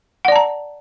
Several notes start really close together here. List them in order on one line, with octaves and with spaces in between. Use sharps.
F#5 D5 A5 A#5